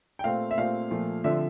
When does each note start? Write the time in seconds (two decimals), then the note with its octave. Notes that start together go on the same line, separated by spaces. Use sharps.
0.19 G5
0.24 A#2 A3 C4 F5
0.51 E5
0.58 A#2 A3 C4 F5
0.91 A#2 F3 A3
1.24 D3 F3 C4 E5